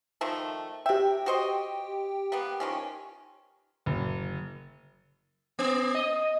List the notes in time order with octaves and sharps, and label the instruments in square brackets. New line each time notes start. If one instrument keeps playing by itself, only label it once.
[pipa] D#3 F3 A3
[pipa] C3 E5 [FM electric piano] G4 G5
[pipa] F#4 C5 D#5
G3 A#3 B3
D#3 F3 C#4
[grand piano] F#1
[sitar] B3
D#5